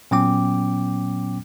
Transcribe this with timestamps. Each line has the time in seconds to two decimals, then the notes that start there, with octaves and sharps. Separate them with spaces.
0.11 A#2 F#3 B3 C#4 G5 D6